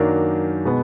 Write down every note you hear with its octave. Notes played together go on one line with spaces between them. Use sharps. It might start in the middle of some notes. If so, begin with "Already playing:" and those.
Already playing: F#2 D#3 F#3 A#3 D4
B2 G#3 B3